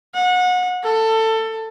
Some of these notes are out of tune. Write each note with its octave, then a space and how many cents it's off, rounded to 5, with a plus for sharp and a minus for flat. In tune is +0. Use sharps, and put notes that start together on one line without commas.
F#5 -30
A4 +20